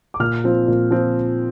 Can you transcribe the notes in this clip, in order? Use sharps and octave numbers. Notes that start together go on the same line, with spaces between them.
D6
A#2 F6
F3 C4 F4
A#2
F3 C4 F4